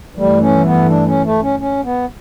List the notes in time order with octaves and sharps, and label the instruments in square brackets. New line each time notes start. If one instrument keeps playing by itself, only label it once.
[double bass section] G2 E3 A3 [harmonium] G3
[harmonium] C#4
B3
D4
C#4
A3
C#4
C#4
B3